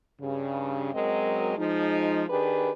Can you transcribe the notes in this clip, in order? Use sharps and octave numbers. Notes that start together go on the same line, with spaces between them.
G2 C#3
F#2 F#3 G#3 C4 A#4 D#5
F3 G#3 D#4
D#3 D4 G4 G#4 B4